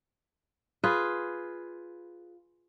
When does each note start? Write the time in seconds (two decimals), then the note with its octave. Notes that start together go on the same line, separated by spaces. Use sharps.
0.84 F4 G#4 B4